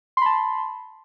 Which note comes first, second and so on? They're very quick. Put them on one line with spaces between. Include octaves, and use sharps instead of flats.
C6 B5 A5